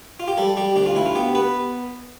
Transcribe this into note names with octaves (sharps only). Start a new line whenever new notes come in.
F4
G4
G3 A4
G3 G4
D2 G4
F4
D2 E4
F4
B3 G4
B3 B4